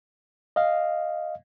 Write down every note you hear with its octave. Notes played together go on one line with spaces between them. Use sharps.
D#5 F5